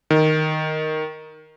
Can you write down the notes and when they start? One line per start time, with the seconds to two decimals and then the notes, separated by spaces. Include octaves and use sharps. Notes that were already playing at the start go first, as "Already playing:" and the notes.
0.10 D#3